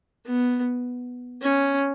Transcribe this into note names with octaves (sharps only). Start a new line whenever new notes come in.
B3
C#4